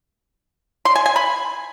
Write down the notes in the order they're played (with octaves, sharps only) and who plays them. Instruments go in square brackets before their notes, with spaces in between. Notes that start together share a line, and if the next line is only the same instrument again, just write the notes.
[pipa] C6
G#5
G#5
B5